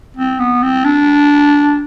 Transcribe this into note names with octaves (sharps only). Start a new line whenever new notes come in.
C4
B3
C4
D4